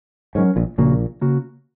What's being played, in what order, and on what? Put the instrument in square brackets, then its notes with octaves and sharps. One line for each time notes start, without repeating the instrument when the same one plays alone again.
[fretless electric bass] G#2 [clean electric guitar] F#3 C#4 A#4 C#5
[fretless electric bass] A#1 A#2
[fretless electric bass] A#1 A#2 [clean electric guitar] C#3 A#3 F#4
[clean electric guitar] C#3 A#3 F#4